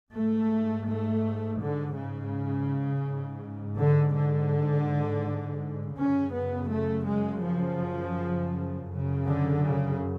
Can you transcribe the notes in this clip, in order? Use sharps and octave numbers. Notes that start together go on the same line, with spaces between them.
G#2 A3
A3
D3
C#3
G#2
D3
D3
F#2 C#3 C#4
B3
A3
G#3
F3
F#2 C#3
D3
C#3